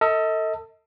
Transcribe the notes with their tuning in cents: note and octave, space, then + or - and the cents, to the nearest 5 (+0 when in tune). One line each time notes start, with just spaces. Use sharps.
A4 +30 D#5 +40